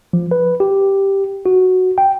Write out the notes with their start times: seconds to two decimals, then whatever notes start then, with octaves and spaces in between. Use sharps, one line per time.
0.13 F3
0.31 B4
0.60 G4
1.46 F#4
1.98 G5